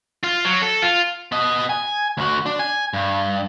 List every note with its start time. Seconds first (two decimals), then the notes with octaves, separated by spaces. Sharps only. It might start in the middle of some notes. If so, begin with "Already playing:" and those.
0.24 F4
0.45 F#3
0.62 A4
0.82 F4
1.32 B3 D#5
1.69 G#5
2.17 D2 F#4
2.46 D4
2.59 G#5
2.93 G2